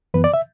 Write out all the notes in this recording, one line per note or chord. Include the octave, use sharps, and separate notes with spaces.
F#2 E3 B3 B4
D5
E5